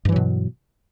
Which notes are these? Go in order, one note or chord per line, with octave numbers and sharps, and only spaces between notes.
G2 B2 E3 F#3